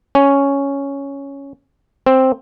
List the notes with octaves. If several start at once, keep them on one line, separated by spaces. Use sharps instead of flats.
C#4
C4